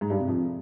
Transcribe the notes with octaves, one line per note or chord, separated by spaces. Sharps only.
G#2
G2
C3
F2